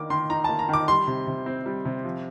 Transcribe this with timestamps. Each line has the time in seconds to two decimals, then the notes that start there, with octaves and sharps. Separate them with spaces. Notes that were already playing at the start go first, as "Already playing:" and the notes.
Already playing: D#3 A#3 D4 D6
0.10 D#3 C6
0.30 D#4 A#5
0.44 A#3 A5
0.59 A#5
0.69 D#3 D6
0.88 G3 C6
1.08 C3
1.27 C3
1.46 C4
1.66 G3
1.85 C3
2.05 F3